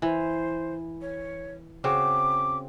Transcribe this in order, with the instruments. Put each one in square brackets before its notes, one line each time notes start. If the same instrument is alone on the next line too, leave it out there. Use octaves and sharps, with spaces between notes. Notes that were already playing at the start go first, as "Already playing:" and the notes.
[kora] E3 [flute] C5
[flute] C#5
[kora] C#3 C4 F#4 [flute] D6